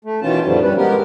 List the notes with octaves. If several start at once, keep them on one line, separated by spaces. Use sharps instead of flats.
A3
B2 D#3 E3 C#4 F4 A5
F#2 A#2 D3 D#3 F3 G3
G2 G3 C#4 B4
G#3 B3 G4 A#4